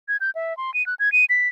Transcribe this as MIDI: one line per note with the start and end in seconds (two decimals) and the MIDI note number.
0.08 0.17 92
0.21 0.30 91
0.35 0.56 76
0.57 0.73 84
0.74 0.85 99
0.86 0.94 90
1.00 1.12 92
1.12 1.25 99
1.30 1.48 95